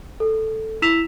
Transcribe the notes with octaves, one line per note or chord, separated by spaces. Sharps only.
A4
E4 E6 B6 E7 F7